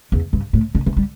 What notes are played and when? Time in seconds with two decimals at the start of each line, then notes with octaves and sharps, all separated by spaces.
0.12 E2
0.33 G2
0.53 A2
0.75 D3
0.86 E3
0.97 G3